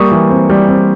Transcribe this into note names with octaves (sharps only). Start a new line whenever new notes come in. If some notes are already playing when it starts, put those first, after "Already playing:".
Already playing: G3 A#3 C#6 D#6
E3
C4
G3
C4